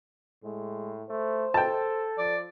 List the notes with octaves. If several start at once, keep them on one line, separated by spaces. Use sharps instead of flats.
A2 G#3
A3 C5
A4 G5 A5
F3 D5